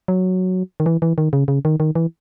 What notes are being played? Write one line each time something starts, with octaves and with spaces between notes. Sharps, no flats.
F#3
D#3
E3
E3
D#3
C#3
C#3
D#3
D#3
E3